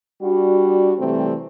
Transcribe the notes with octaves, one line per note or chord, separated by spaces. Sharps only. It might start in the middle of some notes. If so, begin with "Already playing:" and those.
G3 D4 F#4
C3 E3 G3 A3 C4